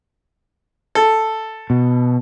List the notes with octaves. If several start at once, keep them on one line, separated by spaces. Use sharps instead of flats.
A4
B2